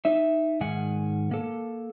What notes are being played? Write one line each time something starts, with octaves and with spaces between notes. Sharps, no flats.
D#4 E5
G#2 D#3 F#5 G#5
A#3 A4